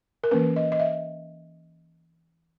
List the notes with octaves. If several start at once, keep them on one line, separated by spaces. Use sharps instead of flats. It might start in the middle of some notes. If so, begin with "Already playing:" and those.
A#4
E3 A#3 C#4 B4
D#5
D#5
E5